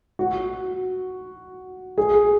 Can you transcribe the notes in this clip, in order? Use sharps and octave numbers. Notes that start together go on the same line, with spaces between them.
F#4
G#4